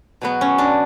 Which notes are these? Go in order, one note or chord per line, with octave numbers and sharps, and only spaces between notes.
B2 F#3 B3
C#4
D4